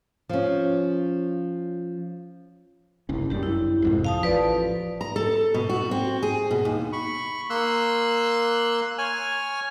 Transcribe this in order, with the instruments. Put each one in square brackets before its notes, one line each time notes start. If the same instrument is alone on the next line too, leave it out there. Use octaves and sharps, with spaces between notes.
[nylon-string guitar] F3 C#4
[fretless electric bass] F#1 C2 C#4
[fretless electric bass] G1 F#2 G3 [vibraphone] G4
[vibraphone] E4
[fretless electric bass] C2 F2 G#2
[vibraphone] F5 A5 D#6
[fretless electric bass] A1 F3 [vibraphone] B4 D5
[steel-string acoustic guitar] A#5
A4
B2
F#4
C4
G#4
B2
D#2
[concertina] B5 C#6
A#3 C6 E6 F#6
C#5 G#5 F6